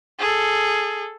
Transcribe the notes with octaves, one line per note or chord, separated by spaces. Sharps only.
G#4 A4